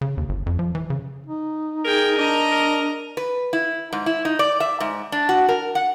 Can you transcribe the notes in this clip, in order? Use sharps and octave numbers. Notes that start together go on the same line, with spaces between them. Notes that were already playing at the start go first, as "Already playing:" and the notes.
C#3
D#2
G1
F2
F3
E3
C#3
D#4
G#4 A#4 G5
D4 D#5 A#5
A#4
B4
E4
G#2
E4
D#4
D5
E5
G#2
D4
F#4
A#4
F#5